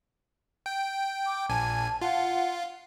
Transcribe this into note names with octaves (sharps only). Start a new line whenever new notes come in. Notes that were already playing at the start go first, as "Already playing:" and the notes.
G5
D6
A#1 G#5 A5
F4 F#5